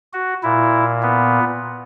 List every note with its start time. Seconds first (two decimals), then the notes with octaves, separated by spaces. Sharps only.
0.13 F#4
0.43 A#2 E4
1.03 B3